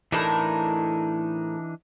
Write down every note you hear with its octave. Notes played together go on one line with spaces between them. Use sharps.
A2 E3 D4 D#4 A#4 A5